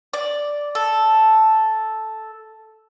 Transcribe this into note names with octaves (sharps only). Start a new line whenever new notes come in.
D5
A4